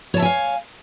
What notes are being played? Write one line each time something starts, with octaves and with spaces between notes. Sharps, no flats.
C#5 E5 F5 G#5 A5